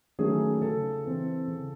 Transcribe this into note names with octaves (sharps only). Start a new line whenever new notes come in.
D#3 F#3 A3 C#4 G#4
C#3 A4
E3 C4
C#3